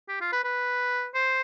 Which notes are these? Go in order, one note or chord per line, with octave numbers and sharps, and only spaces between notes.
G4
F4
B4
B4
C5